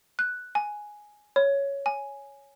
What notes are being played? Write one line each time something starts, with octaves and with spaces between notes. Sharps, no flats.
F#6
G#5
C#5
G#5